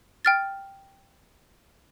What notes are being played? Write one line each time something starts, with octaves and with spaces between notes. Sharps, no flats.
G5 F6 A6